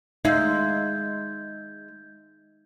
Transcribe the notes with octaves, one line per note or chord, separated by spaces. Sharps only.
G#3 D#4 E5 F5 G6 G#6